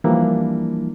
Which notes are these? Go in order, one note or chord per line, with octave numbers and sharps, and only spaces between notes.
E3 F3 G3 A#3 D4 E4